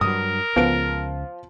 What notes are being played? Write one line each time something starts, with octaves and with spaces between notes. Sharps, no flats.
G2 F#3 A#4 D#6
C#2 F3 B3 F4 B4 D7